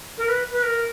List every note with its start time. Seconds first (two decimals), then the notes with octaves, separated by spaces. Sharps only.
0.18 A#4
0.28 B4
0.51 B4
0.63 A#4